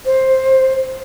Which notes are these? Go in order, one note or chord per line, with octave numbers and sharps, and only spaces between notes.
C5